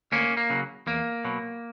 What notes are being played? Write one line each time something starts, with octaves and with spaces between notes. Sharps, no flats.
D2 A#3 C#4
A#3
C#3 F#3
E2 A#3
B2 F#3